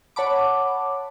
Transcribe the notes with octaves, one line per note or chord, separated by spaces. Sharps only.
C#5 F#5 A5 B5 D6